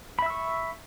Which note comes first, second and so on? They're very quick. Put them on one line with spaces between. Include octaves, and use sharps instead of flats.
B5 E5 E6 C#6